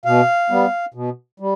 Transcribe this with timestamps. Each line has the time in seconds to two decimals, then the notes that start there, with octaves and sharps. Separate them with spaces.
0.05 B2 F5
0.50 G3 B3
0.94 B2
1.40 G3